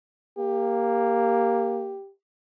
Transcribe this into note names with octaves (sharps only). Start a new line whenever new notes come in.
A#3 G4